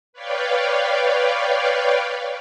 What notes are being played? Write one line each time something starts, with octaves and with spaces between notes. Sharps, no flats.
B4 C#5 D5 F5 G5